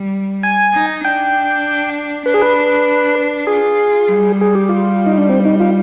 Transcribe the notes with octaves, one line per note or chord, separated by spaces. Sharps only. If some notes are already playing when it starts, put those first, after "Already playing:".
Already playing: G3
G#5
D#4
D4 G5
D4 B4
G#4
B4
F4 G#4
G3
G#4
G4
F4
D#4
D4
C4
D#4
F4